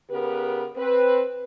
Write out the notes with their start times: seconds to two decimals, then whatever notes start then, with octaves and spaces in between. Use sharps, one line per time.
0.10 C#3 B3 G4 A#4 B4
0.77 C4 B4